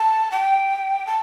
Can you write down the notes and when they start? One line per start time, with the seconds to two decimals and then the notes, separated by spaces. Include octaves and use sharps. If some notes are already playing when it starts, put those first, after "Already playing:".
Already playing: A5
0.32 G5
1.07 A5